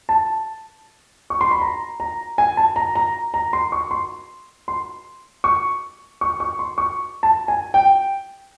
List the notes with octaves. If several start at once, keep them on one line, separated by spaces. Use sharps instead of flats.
A5
C#6
C6
B5
A#5
A#5
G#5
A5
A#5
A#5
A#5
C6
C#6
C6
C6
C#6
C#6
C#6
C6
C#6
A5
G#5
G5